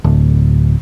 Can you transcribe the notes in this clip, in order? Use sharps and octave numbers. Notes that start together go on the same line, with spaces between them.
D1